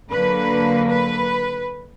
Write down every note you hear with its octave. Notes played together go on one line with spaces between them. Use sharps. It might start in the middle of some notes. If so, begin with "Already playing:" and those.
D3 F#3 A#3 B4
B4